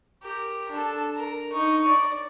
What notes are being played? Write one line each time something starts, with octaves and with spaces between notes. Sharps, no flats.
G4 A#4
D4 A4
A#4
D#4 C#6
D5